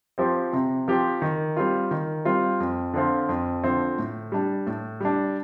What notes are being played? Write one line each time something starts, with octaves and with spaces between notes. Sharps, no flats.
F3 C4 G4
C3
F3 C4 G4
D#3
G3 C4 F4
D#3
G3 C4 F4
F2
D3 F3 C4 F4
F2
D3 F3 C4 F4
A2
G3 D4
A2
G3 D4